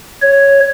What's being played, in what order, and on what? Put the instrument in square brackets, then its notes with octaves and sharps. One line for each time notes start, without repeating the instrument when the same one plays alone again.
[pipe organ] C#5